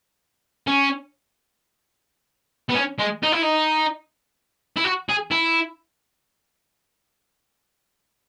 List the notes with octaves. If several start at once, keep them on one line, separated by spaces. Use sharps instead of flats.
C#4
B3
C#4
G#3
D#4
E4
D#4
E4
F#4
G#4
E4